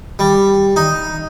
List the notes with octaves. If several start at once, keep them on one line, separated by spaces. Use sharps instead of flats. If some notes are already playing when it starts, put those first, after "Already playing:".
G3
D#4